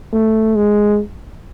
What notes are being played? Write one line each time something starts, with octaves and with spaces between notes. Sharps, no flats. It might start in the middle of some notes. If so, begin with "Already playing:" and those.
A3
G#3